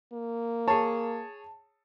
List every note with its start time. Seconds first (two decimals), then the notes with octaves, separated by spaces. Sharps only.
0.13 A#3
0.68 G#4 C#5 A5